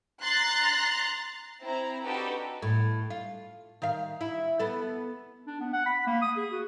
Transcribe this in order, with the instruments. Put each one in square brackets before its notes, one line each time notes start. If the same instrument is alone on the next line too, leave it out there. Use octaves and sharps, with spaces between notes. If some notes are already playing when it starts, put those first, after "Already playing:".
[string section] A#5 C6 F#6 A6
[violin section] C4 E4 A#5
D4 D#4 F#4 G4 A4 B4
[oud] A2
F4
D#3 F5
E4
B3 A4
[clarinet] D4
B3
F#5
B5
A#3
D#6
G#4
F#4